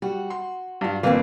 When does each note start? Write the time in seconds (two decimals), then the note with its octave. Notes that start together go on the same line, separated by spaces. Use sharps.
0.02 G3 F#4
0.30 C6
0.81 G2 F4
1.03 G1 F2 E3 A#3 C4 F5